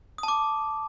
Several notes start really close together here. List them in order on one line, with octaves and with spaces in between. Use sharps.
D#6 A5 D6